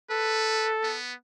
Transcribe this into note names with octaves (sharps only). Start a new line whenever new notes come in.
A4 B4
B3